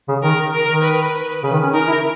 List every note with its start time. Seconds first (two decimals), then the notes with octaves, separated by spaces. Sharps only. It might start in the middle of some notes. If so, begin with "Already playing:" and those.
0.08 C#3
0.23 D#3 A#4
0.53 A#4
0.69 D#3
0.83 B4
1.43 C#3
1.52 D#3
1.63 C#4
1.73 D#4 A#4
1.87 E4